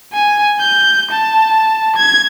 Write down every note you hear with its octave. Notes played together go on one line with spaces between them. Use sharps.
G#5
G6
A5
G#6